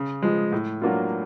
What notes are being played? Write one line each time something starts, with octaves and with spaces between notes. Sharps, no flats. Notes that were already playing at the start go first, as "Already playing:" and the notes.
Already playing: C#3
F3 G#3
A2
F#3 A#3 D4 F4